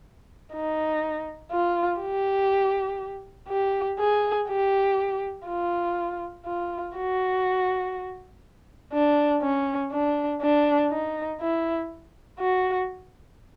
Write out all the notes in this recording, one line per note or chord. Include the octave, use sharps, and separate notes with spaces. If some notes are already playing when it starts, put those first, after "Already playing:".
D#4
F4
G4
G4
G#4
G4
F4
F4
F#4
D4
C#4
D4
D4
D#4
E4
F#4